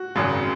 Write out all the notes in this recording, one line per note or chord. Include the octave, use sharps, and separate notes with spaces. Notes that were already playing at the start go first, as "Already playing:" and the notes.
Already playing: F#4
G#1 F#2 C#3 F#3